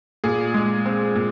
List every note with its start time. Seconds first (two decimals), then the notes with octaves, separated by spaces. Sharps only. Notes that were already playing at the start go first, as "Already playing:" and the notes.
0.24 A#2 G#4
0.54 G#3
0.86 C4
1.15 A#2